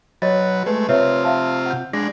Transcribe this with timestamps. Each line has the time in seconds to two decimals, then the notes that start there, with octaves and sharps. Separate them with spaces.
0.22 F#3 B4 C#5 D#5 A6
0.66 G#3 A3 B4
0.89 C3 F4 B4 C#5 E5
1.25 E5 F5 A5
1.66 F#5 G6
1.93 G#3 D4 A#6